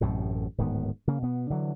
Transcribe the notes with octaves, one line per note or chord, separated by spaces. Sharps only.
A1 F#2 A2 C3
D1 G#2 D#3 B3
C#3 A#3
B2 B3
D3 E3 F#3